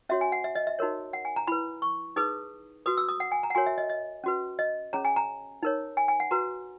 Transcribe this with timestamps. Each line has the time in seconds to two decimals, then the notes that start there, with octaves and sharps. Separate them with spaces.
0.09 C#4 F#4 C#5 E5
0.21 G#5
0.32 F#5
0.44 E5
0.55 D#5
0.67 E5
0.79 D#4 F#4 A#4 C#5
1.13 F#5
1.25 G#5
1.36 A#5
1.47 E4 B4 B5
1.82 C#6
2.16 D#4 G#4 B4 D#6
2.86 F#4 B4 D#6
2.97 E6
3.09 D#6
3.20 F#5
3.32 G#5
3.43 A#5
3.50 F#5
3.55 F#4 A#4 C#5 G#5
3.67 E5
3.78 D#5
3.90 D#5
4.24 C#4 F#4 B4
4.59 D#5
4.93 C#4 G#4 C#5 A#5
5.05 G#5
5.16 A#5
5.63 D#4 A#4 C#5
5.97 G#5
6.08 G#5
6.20 F#5
6.31 F#4 B4 A#5